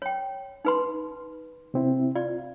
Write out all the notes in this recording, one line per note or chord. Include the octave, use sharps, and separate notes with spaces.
C#5 G5
D#4 B4 C6
C3 C4 E4
F4 D5